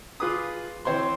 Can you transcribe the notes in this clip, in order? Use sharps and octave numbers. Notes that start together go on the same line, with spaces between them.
F4 G#4 B4 D6 D#6
E3 C4 C5 C#5 C6